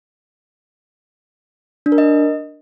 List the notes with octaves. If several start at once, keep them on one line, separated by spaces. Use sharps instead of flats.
D4
A#4
D#5